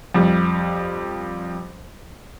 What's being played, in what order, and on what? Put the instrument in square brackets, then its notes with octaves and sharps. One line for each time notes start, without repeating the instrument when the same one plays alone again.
[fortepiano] F2 G3